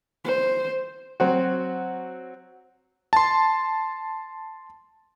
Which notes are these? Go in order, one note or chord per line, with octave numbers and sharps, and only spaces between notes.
C5
F#3 C4 F#4
A5 C6